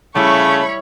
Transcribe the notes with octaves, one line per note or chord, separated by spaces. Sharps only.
C#3 G3 A3 E4 C#5 B5 C#6